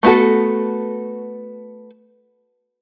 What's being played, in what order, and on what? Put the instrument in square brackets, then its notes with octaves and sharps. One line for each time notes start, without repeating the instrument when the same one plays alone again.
[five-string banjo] A3 B3 F#4 A4